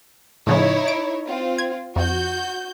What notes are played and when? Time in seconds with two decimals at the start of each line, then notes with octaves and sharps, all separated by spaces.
0.47 A2 C#3 F3 D#4 E4 C#5
0.88 D7
1.28 C4 F4
1.58 G#6
1.96 F2 F#4 G6